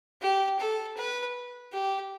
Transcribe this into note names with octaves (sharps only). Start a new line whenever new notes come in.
G4
A4
B4
G4